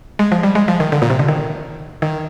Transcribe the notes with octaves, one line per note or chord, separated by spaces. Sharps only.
G#3
F3
G3
G#3
F3
D#3
D3
A#2
C3
D3
D#3
D#3